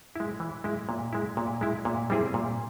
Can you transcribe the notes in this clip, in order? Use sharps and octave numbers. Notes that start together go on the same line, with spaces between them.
G#3 E4
E3
G#3 E4
A#2
G#3 E4
A#2
G#3 E4
A#2
G3 C4 E4 G#4
A#2